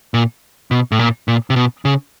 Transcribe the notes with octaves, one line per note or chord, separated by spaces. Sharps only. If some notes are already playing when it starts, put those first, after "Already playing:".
A#2
B2
A2
A#2
A#2
C3
B2
C#3